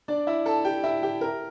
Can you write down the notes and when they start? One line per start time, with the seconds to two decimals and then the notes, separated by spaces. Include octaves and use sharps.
0.08 D4 D5
0.27 E4 E5
0.46 A4 A5
0.65 G4 G5
0.84 E4 E5
1.03 G4 G5
1.21 A#4 A#5